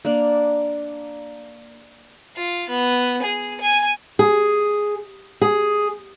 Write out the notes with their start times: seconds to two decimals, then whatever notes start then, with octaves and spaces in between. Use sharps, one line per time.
0.05 A#3 D4
2.36 F4
2.69 B3
3.22 G#4
3.61 G#5
4.19 G#4
5.41 G#4